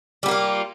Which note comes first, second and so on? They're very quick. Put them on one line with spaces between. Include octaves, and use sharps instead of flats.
G3 B3 A#3 F4